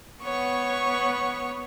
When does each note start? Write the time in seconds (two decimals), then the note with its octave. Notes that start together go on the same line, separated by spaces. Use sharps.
0.23 B3 C#5 C#6